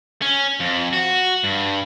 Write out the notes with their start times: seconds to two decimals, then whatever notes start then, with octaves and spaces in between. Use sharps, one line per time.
0.22 C#4
0.60 F2
0.93 F#4
1.44 G2